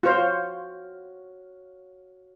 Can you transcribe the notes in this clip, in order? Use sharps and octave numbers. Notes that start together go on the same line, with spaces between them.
F4 F#4 C5 C#5 F5